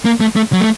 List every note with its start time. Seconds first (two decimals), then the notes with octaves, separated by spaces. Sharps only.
0.05 A#3
0.21 A3
0.36 A3
0.53 F#3
0.61 A3